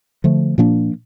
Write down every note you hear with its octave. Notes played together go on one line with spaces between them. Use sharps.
D3 F3 A3
A#2 F3 A#3 D4